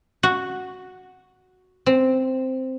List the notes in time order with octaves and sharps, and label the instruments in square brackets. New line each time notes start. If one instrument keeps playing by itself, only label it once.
[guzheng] F#4
C4